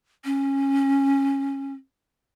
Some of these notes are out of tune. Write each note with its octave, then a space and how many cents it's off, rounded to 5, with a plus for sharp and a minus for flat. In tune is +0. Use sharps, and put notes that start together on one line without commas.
C#4 -15